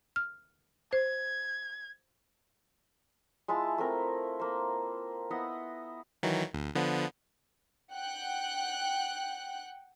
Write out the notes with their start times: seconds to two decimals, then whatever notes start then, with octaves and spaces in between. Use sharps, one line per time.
0.16 F6
0.93 C5 G#6
3.48 G#3 E4 F4 A5
3.78 A3 C4 A#4
4.40 A#3 C5
5.31 B3 E4 D#5 F#5
6.23 D#3 E3 F#3
6.54 D2
6.75 D3 F3 B3
7.93 F#5 G5 F#6